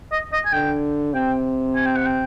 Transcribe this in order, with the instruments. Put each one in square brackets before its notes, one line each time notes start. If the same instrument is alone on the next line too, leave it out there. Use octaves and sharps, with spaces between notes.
[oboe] D#5
D#5
G#5
[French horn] D3 [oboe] G5
[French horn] C3 [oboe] G5
[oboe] G#5
G5
F#5
G5